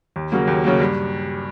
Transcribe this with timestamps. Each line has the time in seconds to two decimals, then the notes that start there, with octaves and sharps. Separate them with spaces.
0.16 D#2
0.32 C#3 F#3 A#3
0.48 D#2
0.64 C#3 F#3 A#3
0.80 G2